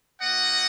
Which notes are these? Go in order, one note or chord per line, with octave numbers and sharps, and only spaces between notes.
A#3 D#4 F#4 D#5 F#5